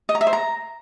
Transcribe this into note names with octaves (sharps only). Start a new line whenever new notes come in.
D#5
A#5
E5
C5
A#5